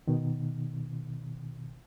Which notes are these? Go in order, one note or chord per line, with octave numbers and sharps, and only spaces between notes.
B2 D#3